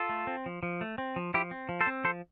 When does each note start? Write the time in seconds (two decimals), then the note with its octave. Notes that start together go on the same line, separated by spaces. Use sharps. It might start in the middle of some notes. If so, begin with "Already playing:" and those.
Already playing: F4 A4
0.09 A3
0.27 C4
0.46 F3
0.63 F3
0.81 A3
0.98 C4
1.16 F3
1.34 F3 E4 G4
1.51 C4
1.69 F3
1.81 A4 C5
1.87 C4
2.04 F3 A4 C5